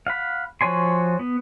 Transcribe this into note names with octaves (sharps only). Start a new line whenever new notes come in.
F5 F#5 B5
F3 F#4 C#5 G#5 C6
B3